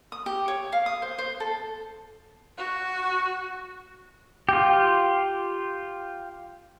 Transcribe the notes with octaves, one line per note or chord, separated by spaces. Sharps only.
D#6
G4
C#5
F5
D#6
C5
C5
A4
F#4
F4 G4